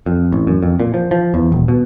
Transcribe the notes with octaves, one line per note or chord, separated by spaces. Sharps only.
F2
A1
F#2
F2
A#2
F3
F3
E2
D#1
B2